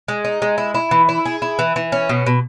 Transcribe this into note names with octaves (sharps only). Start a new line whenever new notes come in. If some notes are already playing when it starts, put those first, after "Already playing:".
G#3
D#4
G#3
E4
E4
E3
E4
G#4
E4
E3
E3
C#4
B2
B2